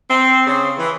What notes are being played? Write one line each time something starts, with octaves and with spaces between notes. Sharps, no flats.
C4
C#3
E3